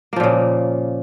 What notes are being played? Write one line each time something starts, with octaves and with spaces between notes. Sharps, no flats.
A#2 C#3 F3 A#3